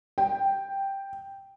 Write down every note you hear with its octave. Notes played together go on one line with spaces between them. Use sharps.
G5